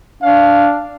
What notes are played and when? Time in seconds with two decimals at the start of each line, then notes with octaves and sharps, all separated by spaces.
0.23 D4 F5